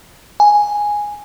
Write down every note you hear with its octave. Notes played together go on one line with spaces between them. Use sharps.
G#5